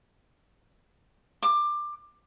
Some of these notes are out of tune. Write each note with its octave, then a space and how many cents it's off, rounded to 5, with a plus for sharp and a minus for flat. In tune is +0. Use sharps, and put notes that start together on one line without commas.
D6 +20